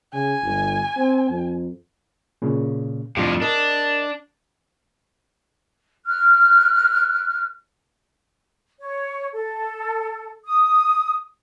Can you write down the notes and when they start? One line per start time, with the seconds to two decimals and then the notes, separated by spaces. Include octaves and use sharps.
0.13 C#3 G#5
0.43 G1
0.97 C4
1.30 F2
2.42 A#2 C#3
3.16 F2 A2 D4 F4 G4
3.42 D4 A#4 D#5 A5
6.06 F6 F#6
8.80 C#5
9.33 A4
10.45 D#6